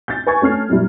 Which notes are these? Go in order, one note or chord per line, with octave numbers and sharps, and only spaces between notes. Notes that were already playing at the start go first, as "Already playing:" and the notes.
G6 A6
B4 G#5 C#6 G#6
A3 C#4 F6 C7
F#2 A#2 G3 E4